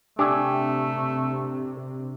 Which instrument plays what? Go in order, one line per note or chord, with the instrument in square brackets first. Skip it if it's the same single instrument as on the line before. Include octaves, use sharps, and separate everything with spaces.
[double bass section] C3 [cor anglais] A3 [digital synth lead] D4 [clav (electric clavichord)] G4 E5 G#5